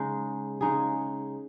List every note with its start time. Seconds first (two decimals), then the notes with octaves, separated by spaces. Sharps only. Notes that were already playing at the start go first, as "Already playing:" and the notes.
Already playing: C#3 G#3 D#4 G#4
0.61 C#3 G#3 D#4 G#4